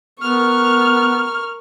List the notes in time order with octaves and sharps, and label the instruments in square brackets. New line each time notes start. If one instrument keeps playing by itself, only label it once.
[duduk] B3 [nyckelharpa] A#4 C#6 [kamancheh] F6